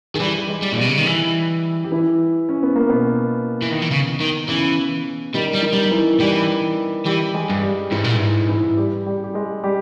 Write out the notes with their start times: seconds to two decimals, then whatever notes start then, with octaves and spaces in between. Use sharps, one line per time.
0.14 D#3 G#4
0.20 E3 G3 G4
0.48 G#3 G#4
0.63 G3
0.72 A#2
0.77 B2 G3 G4
0.89 C#3
0.97 D#3
1.06 E3
1.84 G4
1.92 E3 E4
2.49 C#4
2.63 B3
2.76 A#3
2.89 B2 B3
3.62 E3
3.72 D#3
3.82 E3
3.91 C#3
4.21 D#3
4.49 C#3 E3 C#4
5.35 D#3 G3 D#4
5.54 G3
5.63 D#3 D#4
5.73 G3
5.82 D#4
5.91 E3 E4
6.20 E3 G3 G4
7.05 E3 G3 G4
7.34 G#3 G#4
7.49 G2
7.63 G3 G4
7.91 G#2 E3 E4
8.04 A#2
8.16 G#2 E3 E4
8.48 E3 E4
8.77 G3 G4
9.06 G3 G4
9.24 G4
9.34 G#3 G#4
9.63 G3 G4